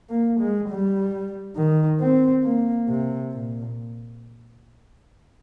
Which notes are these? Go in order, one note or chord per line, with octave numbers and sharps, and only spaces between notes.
A#3
G#3
G3
D#3
C4
A#3
C3
A#2